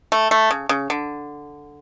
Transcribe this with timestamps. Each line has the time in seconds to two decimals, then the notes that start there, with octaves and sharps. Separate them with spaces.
0.12 A3
0.31 A3
0.51 C#3
0.69 C#3
0.90 D3